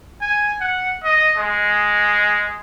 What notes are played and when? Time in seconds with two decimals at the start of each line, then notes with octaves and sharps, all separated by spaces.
0.21 G#5
0.60 F#5
1.04 D#5
1.37 G#3